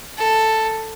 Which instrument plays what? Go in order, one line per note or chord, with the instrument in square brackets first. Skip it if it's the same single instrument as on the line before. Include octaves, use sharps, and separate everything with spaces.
[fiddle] A4